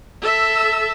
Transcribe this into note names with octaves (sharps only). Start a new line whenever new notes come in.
A4 E5